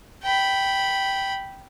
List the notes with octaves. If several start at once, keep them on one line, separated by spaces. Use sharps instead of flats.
G5 B5